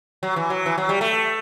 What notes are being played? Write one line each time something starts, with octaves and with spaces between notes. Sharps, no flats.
F#3
E3
F#3
E3
F#3
G3
A3